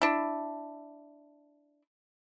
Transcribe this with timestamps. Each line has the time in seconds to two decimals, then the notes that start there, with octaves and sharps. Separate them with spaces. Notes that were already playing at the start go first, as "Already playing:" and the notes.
0.02 D4 E4